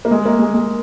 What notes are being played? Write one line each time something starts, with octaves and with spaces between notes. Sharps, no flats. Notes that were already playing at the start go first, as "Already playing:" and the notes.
A#3
G#3
A#3
G#3
G#3